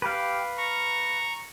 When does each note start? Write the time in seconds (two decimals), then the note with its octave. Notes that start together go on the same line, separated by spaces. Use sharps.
0.02 G4 B4 F5 G5
0.58 A#5 C#6